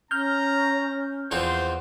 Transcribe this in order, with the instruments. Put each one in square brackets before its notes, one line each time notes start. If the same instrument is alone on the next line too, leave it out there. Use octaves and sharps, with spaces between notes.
[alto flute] C#4 [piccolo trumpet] A#5 [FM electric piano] F6 G6
[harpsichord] E2 F3 C4 [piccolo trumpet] C5